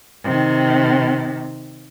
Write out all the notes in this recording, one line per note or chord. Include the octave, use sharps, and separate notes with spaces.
C3 D#3